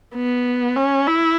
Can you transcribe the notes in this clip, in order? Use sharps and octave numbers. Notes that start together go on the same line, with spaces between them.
B3
C#4
E4